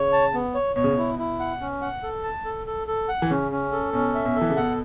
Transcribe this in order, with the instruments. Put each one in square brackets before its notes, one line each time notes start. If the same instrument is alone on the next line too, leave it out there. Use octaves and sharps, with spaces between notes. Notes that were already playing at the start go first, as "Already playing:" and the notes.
Already playing: [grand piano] C#3 [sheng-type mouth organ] C#5
[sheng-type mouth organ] A5
B3
C#5
[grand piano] B2 [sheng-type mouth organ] C#5
[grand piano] C#3
B2
[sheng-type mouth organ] E4
E4
F#5
C#4
F#5
A4
A5
A4
A4
A4
F#5
[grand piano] E3
[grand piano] C#3 [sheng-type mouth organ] C#4
[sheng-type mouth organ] C#4
A4
[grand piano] B2 [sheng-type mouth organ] C#4
[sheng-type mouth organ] E5
[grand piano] B2
[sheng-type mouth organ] A4
[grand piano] E3
C#3
[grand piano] B2 [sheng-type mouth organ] F#5